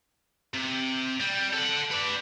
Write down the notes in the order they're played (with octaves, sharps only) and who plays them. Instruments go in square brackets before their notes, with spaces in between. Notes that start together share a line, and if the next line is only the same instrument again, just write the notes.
[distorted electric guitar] C3
G3
A4 F#5
B4 D5